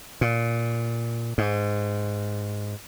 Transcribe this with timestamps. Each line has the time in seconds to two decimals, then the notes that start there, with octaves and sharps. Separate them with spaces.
0.21 A#2
1.38 G#2